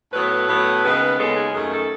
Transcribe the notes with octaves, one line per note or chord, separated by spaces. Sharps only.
A2 F#3 B3 B4
A2 F#3 B3
D#2 C#3 G#3 B3
D#2 C#3 G#3 B3 A4
G#4
F#2 D#3 A3 G#4
A4